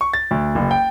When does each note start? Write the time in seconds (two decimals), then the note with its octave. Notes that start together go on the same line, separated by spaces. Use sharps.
0.01 C#6
0.13 A6
0.31 D2
0.55 F#1
0.71 G5